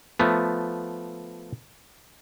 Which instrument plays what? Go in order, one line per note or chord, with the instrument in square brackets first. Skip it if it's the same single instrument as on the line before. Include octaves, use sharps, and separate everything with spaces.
[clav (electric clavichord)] F3 A3 B3